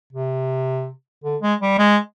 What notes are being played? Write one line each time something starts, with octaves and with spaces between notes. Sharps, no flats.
C3
D3
G#3
G3
G#3